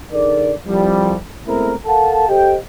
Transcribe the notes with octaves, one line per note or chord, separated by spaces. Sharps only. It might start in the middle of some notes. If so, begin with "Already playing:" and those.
D3 D#4 G#4 A#4 D5
C2 F2 F3 G3
G#3 A3 B3 C4 E4 A#4
A4 A#4 F5 F#5 A5
G4 A4 C5 D#5 G5